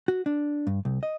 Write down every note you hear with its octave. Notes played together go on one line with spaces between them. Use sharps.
F#4
D4
G2
C2
D#5